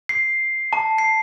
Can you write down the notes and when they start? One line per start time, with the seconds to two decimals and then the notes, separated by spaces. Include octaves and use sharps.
0.09 C7
0.73 A5
0.98 C7